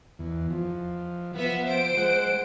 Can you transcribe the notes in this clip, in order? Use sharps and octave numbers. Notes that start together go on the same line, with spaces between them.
E2
F3
F3 B3 E5
C5 D7
G#3 F#5